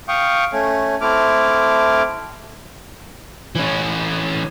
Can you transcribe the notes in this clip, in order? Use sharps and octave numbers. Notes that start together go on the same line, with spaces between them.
F5 G5 C#6 D#6
A3 C#4
A3 C4 E4 D6 F6
E3 C#4